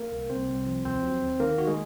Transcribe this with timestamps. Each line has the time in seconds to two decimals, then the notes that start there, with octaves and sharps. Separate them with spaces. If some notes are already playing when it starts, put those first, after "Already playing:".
Already playing: A#3 A#4
0.11 C2
0.30 C2 C4 C5
0.48 C2
0.66 F3
0.85 D#2 C4 C5
1.03 F#3
1.22 D#2
1.39 D#3 A#3 A#4
1.58 D#3 F#4
1.67 G#3 G#4